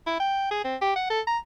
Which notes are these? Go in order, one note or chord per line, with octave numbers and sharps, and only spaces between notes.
E4
G5
G#4
C4
G4
F#5
A4
A#5